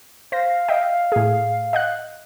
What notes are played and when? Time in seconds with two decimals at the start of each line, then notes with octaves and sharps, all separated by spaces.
0.32 C5 F5 A#6
0.68 D#5 E5 G5
1.12 A2 G#4
1.73 D#5 F#5 F#6